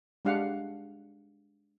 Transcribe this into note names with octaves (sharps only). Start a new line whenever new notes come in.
G#3 D4 G4 F5 F#5